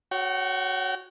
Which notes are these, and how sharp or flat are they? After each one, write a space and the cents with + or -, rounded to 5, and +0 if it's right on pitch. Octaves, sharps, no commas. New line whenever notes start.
F#4 +0 C#5 +0 G5 -40